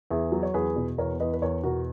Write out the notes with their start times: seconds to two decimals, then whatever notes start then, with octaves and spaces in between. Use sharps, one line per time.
0.10 E2 E4 G#4
0.32 F#3
0.43 C#5
0.54 E2 G#4 B4
0.76 B2
0.98 E2 A#4 C#5
1.20 E2 B4 D#5
1.33 B4
1.42 E2 A#4 C#5
1.63 B2 F#4 A#4